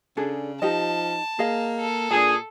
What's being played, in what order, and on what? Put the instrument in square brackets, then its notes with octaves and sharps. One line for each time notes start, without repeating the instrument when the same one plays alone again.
[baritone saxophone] C#3 [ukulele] D4 G#4 A4
[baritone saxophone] F3 [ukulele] D#4 G4 D#5 [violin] A5
[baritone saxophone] A#3 [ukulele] G#4 D#5 F5
[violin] A4
[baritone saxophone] A#2 [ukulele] D4 A5 [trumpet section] G#4